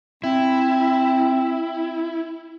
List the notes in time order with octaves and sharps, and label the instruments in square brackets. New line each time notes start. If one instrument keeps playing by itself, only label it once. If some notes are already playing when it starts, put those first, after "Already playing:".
[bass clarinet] C4 [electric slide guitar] E4